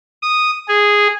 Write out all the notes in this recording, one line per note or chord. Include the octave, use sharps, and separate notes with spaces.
D#6
G#4